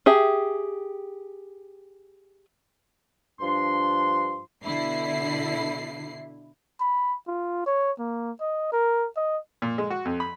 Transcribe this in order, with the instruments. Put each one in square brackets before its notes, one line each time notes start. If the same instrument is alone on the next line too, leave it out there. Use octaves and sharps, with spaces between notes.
[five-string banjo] G4 G#4 E5
[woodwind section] G2 F3 D4 C6
[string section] B2 D3 E4 C7
[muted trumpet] B5
F4
C#5
A#3
D#5
A#4
D#5
[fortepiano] A#2
G#3
F#4
F2
B5